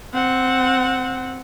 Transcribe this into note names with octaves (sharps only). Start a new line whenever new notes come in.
C4 F#5